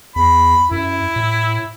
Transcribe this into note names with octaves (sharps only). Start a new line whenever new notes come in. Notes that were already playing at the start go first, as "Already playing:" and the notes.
E2 B5
F#2 E4
A2